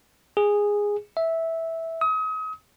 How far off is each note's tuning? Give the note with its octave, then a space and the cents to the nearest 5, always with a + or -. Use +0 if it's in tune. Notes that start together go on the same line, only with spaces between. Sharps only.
G#4 -10
E5 -10
D#6 +35